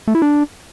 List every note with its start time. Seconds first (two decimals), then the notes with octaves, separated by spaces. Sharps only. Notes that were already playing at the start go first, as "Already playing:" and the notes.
0.08 A3
0.15 E4
0.22 D4